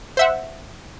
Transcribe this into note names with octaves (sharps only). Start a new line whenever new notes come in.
C5 E5 F#5